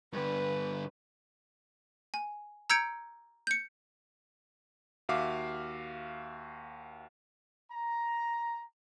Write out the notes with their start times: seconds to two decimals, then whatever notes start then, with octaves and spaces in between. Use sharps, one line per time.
0.13 G2 D3 B4
2.14 G#5
2.70 A#5 E6 G6 G#6 C#7 D7
3.47 G6 C#7
5.09 D#2 F#4 E5 F5 D6
7.72 A#5